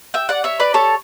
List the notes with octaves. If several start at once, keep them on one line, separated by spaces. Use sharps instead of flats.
E5 G5
D5 F#5
C#5 E5
B4 D5
A4 C#5